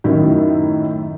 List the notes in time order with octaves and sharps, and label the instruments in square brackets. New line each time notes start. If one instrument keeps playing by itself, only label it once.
[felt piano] F#2 A2 D#3 D#4 E4